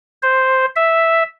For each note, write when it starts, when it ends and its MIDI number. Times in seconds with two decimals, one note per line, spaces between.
0.23 0.66 72
0.76 1.23 76